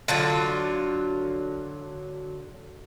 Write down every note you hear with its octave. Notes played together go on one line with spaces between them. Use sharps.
D3 F#3 F4